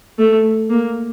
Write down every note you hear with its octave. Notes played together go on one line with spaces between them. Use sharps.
A3
A#3